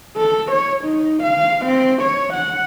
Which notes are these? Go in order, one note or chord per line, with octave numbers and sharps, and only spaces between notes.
A4
C#5
D#4
F5
C4
C#5
F#5